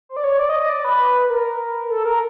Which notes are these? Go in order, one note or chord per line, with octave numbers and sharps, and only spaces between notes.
C5
D5
C#5
D5
D#5
D#5
D5
B4
A#4
A4
A#4